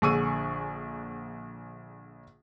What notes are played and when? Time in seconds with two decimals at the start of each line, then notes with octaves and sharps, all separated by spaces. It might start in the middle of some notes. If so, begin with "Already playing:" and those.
0.02 A#1 D3 G#4 C#6 E6 D#7